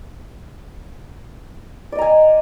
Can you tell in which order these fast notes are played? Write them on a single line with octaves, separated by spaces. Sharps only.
D5 D#5 A#5 G#5